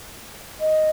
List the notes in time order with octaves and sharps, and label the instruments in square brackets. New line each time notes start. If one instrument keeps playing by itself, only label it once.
[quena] D#5